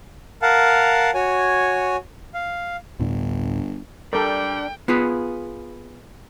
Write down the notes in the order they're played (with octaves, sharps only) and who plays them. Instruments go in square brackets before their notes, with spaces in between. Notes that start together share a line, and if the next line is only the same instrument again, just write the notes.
[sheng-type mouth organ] A#4 F5 F#5 A5
F#4 C#5 G#5
F5
[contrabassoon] G1 [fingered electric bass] D2 A2 D4
[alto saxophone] G3 [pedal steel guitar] D4 D5 [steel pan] A4 A#4 [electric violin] G5
[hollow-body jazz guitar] B3 F4 G#4 B4